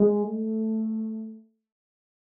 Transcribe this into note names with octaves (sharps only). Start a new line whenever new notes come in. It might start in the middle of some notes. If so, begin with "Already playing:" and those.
Already playing: G#3
A3